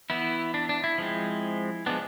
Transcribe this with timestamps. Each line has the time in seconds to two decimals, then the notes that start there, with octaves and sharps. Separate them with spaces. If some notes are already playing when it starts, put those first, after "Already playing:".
0.10 E3 B3 E4
0.54 D4
0.69 D4
0.84 E4
0.98 F3 G#3 C4
1.86 F3 G#3 B3 D4